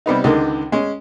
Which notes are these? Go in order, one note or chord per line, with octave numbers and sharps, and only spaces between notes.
C3 G3 B3 D#4
C#2 D3 D#3 G#3
G#3 C#4